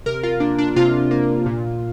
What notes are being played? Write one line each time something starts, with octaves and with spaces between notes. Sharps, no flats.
C3 A#4
F4
A#3 D4
D4
C3 F4
A#3
A#2